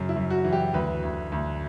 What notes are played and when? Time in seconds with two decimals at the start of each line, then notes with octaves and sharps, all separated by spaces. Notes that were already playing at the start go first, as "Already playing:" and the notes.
Already playing: F#2 C#3
0.09 E4
0.16 F#2
0.30 F#4
0.45 E3
0.52 G4
0.74 D2 B4
1.03 D2
1.32 D2